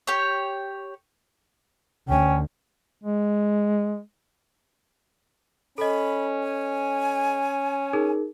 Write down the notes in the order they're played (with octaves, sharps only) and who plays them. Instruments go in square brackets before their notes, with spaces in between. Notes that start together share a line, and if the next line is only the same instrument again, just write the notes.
[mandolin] G4 C#5
[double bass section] D2 [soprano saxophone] C#4 [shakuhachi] G5
[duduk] G#3
[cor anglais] C#4 [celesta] A4 D#5 [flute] B5
[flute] G#5
[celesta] D#4 G#4 A#4